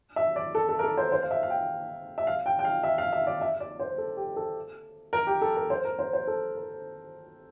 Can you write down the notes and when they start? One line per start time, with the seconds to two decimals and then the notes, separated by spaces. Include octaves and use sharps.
0.16 E5
0.36 D5
0.55 A4
0.69 A4
0.79 A#4
0.84 A4
0.97 C5
1.12 C5
1.22 F5
1.31 E5
1.43 F5
1.50 G5
2.18 E5
2.27 F5
2.46 G5
2.59 G5
2.65 F5
2.83 E5
2.98 F5
3.13 E5
3.27 D5
3.41 E5
3.60 D5
3.80 C5
3.98 A4
4.17 G4
4.36 A4
5.13 A#4
5.27 G4
5.41 A4
5.56 A#4
5.70 C5
5.85 A#4
5.99 C5
6.13 C5
6.27 A4
6.56 A#4